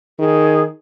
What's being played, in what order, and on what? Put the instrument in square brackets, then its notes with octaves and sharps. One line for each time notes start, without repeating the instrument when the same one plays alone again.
[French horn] D#3 [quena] G#4